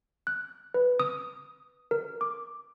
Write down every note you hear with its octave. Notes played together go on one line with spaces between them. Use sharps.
F#6
B4
D#6
A#4
D6